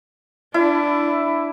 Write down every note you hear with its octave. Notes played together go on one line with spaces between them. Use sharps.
D4 E4